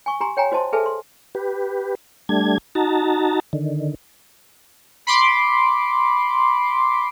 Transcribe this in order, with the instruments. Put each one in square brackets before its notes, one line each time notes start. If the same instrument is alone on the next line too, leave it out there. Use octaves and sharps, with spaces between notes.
[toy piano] G#5 C#6
G4 G#5 A#5 C6
C#5 G5 G#5 A#5
F#4 C5 D#5 A5 C6
G#4 A4 B4 E5 G#5 A5
C6
[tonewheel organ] G4 B4
G3 A3 D4 G#6
D#4 F#4 A5 A#5
D3 D#3
[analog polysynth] B5 C6 D6